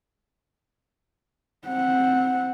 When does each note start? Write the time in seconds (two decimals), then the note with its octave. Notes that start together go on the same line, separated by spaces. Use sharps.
1.68 C4 F#5